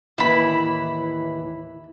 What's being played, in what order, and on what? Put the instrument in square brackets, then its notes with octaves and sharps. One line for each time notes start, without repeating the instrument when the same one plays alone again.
[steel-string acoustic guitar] D#2 A2 E3 [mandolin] E4 B5